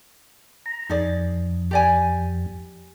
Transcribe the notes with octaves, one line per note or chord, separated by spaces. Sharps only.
A#5
F2 D#4 G#4 D5
G4 D5 G#5